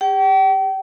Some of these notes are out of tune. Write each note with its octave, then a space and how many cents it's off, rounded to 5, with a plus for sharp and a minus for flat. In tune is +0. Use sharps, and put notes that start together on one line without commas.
G4 +45 G5 -40